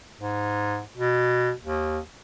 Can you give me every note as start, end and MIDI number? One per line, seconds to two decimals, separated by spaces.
0.21 0.80 44
0.97 1.52 47
1.63 1.99 39